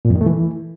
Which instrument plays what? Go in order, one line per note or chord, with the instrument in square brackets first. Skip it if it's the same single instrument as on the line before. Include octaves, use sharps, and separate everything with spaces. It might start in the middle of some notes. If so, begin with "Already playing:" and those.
[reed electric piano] A#2
F2
D#3
A3
E3